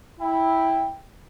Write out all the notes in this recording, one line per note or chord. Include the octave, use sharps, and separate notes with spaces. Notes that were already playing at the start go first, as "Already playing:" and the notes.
E4 G5